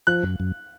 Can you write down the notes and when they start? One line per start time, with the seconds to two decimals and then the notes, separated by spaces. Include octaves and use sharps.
0.07 F3 F#6
0.23 F#2
0.40 F#2